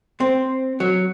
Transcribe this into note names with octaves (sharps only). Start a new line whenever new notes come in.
C4
F#3